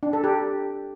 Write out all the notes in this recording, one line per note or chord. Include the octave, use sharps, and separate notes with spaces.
D4
A4
G4